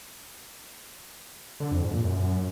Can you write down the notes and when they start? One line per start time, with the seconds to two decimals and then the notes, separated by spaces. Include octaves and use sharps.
1.60 D3
1.71 F2
1.82 G#2
1.93 A#2
2.04 F#2